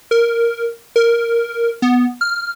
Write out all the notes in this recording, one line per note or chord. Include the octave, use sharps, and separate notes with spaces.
A#4
A#4
B3
F6